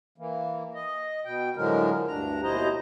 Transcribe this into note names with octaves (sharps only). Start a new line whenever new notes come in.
E3 A#3
D#5
B2 G5
A2 D3 F3 F#3 G#3 A#4
D2 G2 D4 A#5
D#2 B2 E4 C5 D#5 A#5